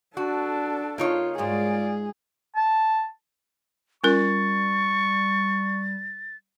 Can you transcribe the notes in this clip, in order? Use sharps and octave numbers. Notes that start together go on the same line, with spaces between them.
D4 F#4 A4
C#3 A#3 D#4 F4 C#5
G#2 G#3 F4 F#4 G#4 D5
A5
G3 C#4 F4 A#4 C#6 A6